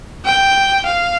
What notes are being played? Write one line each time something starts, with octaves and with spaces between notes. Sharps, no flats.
G5
F5